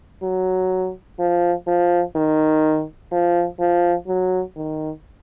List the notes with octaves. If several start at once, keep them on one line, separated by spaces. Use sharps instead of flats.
F#3
F3
F3
D#3
F3
F3
F#3
D#3